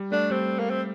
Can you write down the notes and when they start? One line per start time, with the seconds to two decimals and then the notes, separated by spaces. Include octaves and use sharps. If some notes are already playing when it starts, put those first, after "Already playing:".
Already playing: G3
0.12 A3 D4
0.31 G3 C4
0.59 A#3
0.71 C4